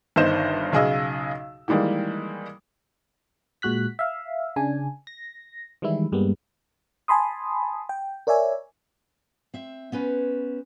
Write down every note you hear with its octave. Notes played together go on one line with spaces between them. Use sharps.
G1 G2 D#3 C5 D#5 E7
B1 C#3 G#4 D#5 E6
D#3 E3 G3 G#3 A#3
A#2 G#3 F#4 F#6 B6
E5 F5
C#3 D4 G#5
A#6
D#3 E3 G3 G#3 E4
G2 G3 G#3 A#3 B3
G#5 A5 B5 C6 D#6
G5
A#4 C#5 D5 E5 G#5
C4 E5
B3 C#4 B4 C5